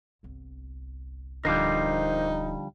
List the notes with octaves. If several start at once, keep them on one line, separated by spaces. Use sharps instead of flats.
G1 C2
D1 D3 F3 G3 D#4 A#4 C5 D6